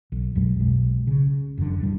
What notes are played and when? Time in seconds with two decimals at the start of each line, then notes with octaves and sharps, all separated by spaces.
0.12 B1
0.35 F2 B2 F#3 G#3
0.59 B1 B2 G#3
1.07 C#3
1.57 F1 F#2 B2 D3
1.80 F#2 A2 G3